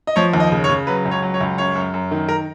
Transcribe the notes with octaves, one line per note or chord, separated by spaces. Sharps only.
D#5
F3 C#5
D#2
D#5
C#3
C#5
C#3
F#3 B4
C#2
C#5
F#3
C#5
C#2
F#2 C#5
F#2
F#2
D#3
A#4